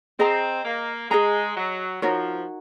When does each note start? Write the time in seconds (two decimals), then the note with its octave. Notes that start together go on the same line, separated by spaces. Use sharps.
0.19 C4 G#4 D#5 A#5
0.65 A#3
1.11 G#3 G#4 D#5 A#5
1.57 F#3
2.02 F3 D#4 F#4 A#4 C#5